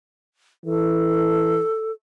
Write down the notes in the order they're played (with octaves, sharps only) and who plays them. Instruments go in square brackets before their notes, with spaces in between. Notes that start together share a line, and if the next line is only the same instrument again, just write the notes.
[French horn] E3 [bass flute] A4